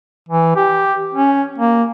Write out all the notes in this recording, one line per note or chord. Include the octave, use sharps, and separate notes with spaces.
E3
G4
C#4
A#3